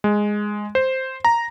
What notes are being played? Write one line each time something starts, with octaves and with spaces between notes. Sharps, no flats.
G#3
C5
A#5